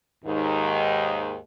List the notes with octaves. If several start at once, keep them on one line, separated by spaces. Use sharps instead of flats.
D#2 G#2 D#3